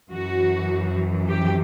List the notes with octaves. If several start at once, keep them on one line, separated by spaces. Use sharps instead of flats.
F#2 E3 F#4
G4